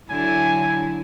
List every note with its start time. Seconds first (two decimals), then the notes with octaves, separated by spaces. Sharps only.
0.10 D3 F#3 E4 G#5